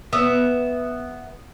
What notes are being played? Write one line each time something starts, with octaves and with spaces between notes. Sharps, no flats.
B3 E5